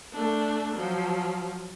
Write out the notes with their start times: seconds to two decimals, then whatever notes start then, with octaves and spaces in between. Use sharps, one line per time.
0.13 A3 D4
0.76 F3 F#3